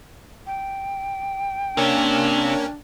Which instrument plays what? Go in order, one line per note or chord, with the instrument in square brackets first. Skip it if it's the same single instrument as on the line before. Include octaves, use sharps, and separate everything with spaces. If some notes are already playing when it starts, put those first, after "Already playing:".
[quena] G5
[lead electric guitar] C3 [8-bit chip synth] A#3 C#4 [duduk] D4